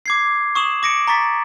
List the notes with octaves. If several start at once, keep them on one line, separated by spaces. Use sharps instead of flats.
D6 G#6 C7
C#6 D#6 E7 F#7
D6 A#6 C#7 D7
A#5 C#6 A6 B6